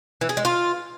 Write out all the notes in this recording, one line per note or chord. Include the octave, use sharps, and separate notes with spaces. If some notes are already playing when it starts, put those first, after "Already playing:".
E3
G#4
G#3
F4